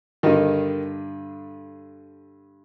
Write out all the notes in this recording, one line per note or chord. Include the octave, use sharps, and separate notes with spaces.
G2 D3 D#3 D#4